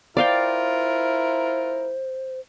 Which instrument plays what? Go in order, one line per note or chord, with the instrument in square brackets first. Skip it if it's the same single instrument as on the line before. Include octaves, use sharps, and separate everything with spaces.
[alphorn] E4 [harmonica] F4 A#4 [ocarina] C5 [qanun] D5 F5 G5